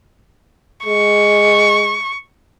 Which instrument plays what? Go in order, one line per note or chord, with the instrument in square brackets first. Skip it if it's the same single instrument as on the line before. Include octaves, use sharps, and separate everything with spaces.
[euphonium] G#3 [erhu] C#6